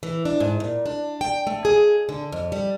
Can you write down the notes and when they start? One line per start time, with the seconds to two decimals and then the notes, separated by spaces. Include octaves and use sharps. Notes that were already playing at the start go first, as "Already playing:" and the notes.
0.03 E3
0.25 D4
0.40 G#2
0.60 A#2
0.86 D4
1.21 G5
1.47 A3
1.65 G#4
2.09 D3
2.32 F2
2.52 G3